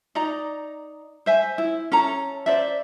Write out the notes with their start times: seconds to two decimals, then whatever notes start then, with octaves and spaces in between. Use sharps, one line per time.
0.15 D#4 D5 D#5 A#5
1.26 C5 E5 G#5
1.58 E4
1.92 C#4 A4 A#5
2.46 C5 D5 E5